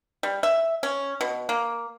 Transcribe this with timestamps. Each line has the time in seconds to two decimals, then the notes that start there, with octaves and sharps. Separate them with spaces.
0.23 G3
0.43 E5
0.83 C#4
1.21 B2
1.49 A#3